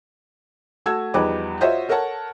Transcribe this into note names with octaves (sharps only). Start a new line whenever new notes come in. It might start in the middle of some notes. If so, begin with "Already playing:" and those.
A3 F#4 A5 E6 G#6
E2 F3 G3 D#4 B4 D6
F4 F#4 C5 C#5 D#5 E5
A4 A#4 C#5 F#5 A5